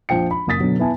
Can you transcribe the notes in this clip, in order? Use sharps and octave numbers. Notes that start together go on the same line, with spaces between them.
A#1 F3 G5 C#7
B5
F#1 A#3 D#6 A6 B6
B2 D3 F#3
B3 E4 G#5 A5